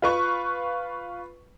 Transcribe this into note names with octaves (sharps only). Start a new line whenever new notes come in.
F4 B4 C#6